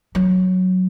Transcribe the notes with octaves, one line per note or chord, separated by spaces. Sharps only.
F#3